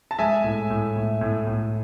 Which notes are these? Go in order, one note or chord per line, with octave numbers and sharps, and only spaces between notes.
A5
G#3 E5 G#5
A2
A2
A2
A2
A2